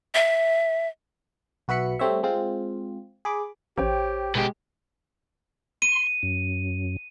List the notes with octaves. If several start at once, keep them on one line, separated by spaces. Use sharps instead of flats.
E5
B1 F#4 B4 E5 B5 C#7
G3 A3 C4 C#5 E5
G#3 C4 F4
G#4 B5 D6
A1 G4 C5 C#5 G5
B2 G#3 G4
C6 D#7
F#2